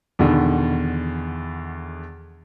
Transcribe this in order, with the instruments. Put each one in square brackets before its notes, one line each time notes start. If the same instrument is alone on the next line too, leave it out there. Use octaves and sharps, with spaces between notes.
[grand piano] E2 B2 D3 D#3